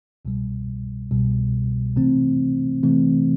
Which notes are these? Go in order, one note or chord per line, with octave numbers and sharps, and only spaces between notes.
C2 B2 G3
C2 B2 G3
C3 E3 A3 C4
C3 E3 A3 C4